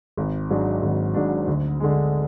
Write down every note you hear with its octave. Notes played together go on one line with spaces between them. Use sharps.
G#1
G#2 F#3 D4
G#1
G#2 F#3 D4
D2
D3 G#3